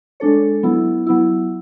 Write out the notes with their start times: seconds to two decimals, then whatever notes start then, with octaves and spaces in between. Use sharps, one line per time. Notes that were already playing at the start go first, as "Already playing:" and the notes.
0.20 G#3 D4 A4 C#5
0.63 F#3 B3 E4
1.06 F#3 B3 E4